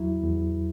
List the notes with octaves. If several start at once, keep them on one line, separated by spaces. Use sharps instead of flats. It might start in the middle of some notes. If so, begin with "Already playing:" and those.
Already playing: E2 F#3 E4
E2